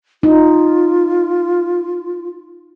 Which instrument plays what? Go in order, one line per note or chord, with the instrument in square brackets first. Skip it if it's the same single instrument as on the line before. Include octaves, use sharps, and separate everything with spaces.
[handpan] D#4 [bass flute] F4